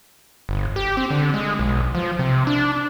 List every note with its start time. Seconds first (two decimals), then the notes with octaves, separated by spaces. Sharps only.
0.49 G1
0.76 G4
0.97 C4
1.10 D3
1.34 G#3
1.59 B1
1.95 F3
2.19 C3
2.47 D4